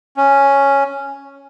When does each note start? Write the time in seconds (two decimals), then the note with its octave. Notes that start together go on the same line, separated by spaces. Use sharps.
0.17 C#4